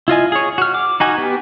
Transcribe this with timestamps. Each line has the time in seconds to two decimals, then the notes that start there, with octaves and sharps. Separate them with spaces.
0.08 E4 F4 D#5 G#5
0.32 G#4 C#5
0.58 F#4 F6
0.74 D6
1.00 D#4 F#4 G#5
1.18 B3 G4